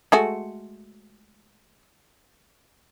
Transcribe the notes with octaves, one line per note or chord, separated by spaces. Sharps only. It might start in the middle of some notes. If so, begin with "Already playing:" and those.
G#3 A3 F#4